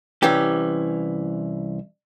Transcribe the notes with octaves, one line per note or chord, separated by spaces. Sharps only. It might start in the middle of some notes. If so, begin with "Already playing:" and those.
C2 E3 C#4 G4